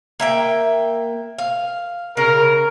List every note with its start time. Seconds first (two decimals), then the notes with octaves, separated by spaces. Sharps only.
0.20 A#3 E5 G5
1.38 F5
2.17 C#3 A#4